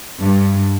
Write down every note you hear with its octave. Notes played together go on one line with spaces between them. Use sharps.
G2